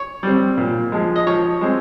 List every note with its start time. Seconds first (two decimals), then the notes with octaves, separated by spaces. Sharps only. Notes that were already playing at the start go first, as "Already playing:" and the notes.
Already playing: C#5
0.23 G3 C4
0.58 A#2
0.92 F3 G#3
1.16 D#5
1.27 F3 C#5
1.61 G#3 C4